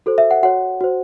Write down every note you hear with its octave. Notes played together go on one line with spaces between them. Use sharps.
F#4 A4 C5
E5
F#5
F#4 C#5 F#5
F#4 C5